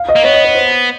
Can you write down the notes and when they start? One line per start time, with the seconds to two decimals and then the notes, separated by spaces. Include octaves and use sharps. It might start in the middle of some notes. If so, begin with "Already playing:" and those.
Already playing: F5
0.09 D#5
0.16 A#3
0.23 B3 C#5
0.34 D#5
0.44 C#5
0.55 C5